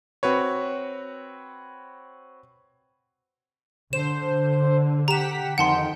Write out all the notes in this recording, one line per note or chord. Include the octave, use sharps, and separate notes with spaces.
C4 F#4 B4 C#5
D3 C5 E7
G4 F#5 A#5 B6 E7
F2 D#3 F#5 G5 A5 C6